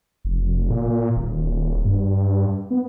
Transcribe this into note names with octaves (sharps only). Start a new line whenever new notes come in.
F1
A#2
D#1
G2
B3